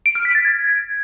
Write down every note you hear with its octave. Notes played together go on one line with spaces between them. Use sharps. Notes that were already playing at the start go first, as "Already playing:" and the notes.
D7
F6
B6
A6
G#6